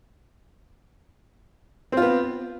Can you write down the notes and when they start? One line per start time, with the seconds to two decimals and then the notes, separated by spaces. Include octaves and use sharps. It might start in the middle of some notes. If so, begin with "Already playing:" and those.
1.92 C4
1.97 F4
2.02 B3